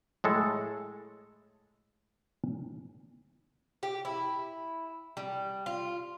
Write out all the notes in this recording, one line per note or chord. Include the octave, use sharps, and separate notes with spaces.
A2 G#3 A4
G4
E4
G3
F4